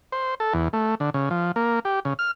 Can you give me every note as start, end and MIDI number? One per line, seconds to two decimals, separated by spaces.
0.12 0.35 72
0.40 0.53 69
0.54 0.68 40
0.73 0.95 57
1.00 1.10 50
1.14 1.29 49
1.30 1.52 53
1.56 1.79 58
1.85 2.00 67
2.05 2.14 49
2.19 2.31 89